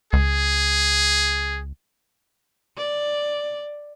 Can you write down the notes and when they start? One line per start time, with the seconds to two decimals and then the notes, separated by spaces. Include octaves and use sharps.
0.13 C#2 G#4
2.77 D5